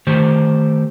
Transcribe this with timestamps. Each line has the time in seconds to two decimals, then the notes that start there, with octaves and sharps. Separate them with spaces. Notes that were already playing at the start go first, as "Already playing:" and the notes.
0.07 D#3 A3 G4 C5